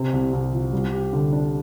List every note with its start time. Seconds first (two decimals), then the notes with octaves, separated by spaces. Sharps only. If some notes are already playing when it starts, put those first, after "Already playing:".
Already playing: C3
0.13 C2
0.33 C2
0.53 F3
0.73 G3
0.92 G4
1.13 D3
1.32 D4